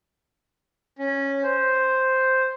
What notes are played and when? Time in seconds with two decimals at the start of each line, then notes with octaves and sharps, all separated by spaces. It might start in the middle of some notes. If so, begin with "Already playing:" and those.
0.99 C#4
1.43 C5